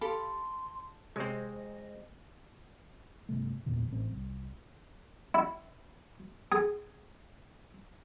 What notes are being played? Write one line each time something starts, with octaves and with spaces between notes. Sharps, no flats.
G4 A4 F5 B5 C6
C3 G#3 C4 C5 C#5 D#5
G1 C3 A3
A1 E2 A#2 D3
A1 C4
C2
E4
G#4